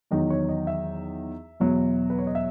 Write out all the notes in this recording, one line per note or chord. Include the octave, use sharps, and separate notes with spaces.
E2 D#3 F#3 D#5
C#5
D#5
E5
E2 B2 F#3
B4
C#5
D#5
E5